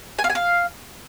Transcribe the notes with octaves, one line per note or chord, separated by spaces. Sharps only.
G#5
F5
G#5
F5